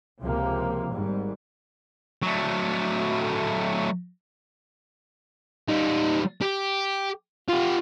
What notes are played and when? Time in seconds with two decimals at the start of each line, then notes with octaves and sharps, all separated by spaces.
0.20 C#2 C3 F3 A#3
0.92 G#1 G#2 G3
2.23 F#3 A3
5.69 G3 D#4
6.42 G4
7.48 F4 G4